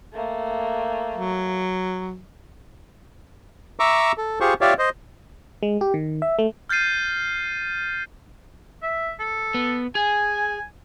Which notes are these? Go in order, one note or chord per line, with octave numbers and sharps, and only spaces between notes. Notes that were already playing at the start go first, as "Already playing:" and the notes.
A3 A#3
F#3
E5 A#5 C#6 D6 E6
A4
F4 G4 G#4 C5 C#6
F4 G4 C#5 D5 E5 F5
C5 D#5
G#3
G4
D#3
E5
A3
F6 G6 A6 C7 D#7
E5
A4
B3
G#4 G#5